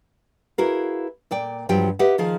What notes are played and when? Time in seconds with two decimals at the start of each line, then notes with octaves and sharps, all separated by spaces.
0.58 E4 F#4 G#4 A#4 B4 F5
1.31 A#2 D5 G5
1.69 G2 F3 F#3 G4 G5
1.99 G4 B4 D#5 E5 F#5
2.18 D#3 F3 G#4